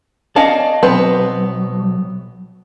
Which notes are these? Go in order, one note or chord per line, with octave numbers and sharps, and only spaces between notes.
C#4 D5 D#5 F5 A5
B1 F#3 B3 C4 B4